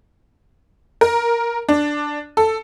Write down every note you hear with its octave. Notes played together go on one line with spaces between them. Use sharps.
A#4
D4
A4